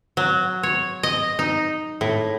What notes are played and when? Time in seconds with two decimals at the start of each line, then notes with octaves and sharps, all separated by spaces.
0.17 F#3
0.63 C#5
1.03 D#5
1.39 D#4
2.01 A2